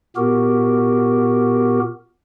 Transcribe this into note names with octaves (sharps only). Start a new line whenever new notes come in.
A#2 B3 F#4 G4 A#4